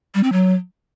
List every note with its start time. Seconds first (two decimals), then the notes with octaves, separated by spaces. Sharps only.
0.14 G3
0.23 C4
0.32 F#3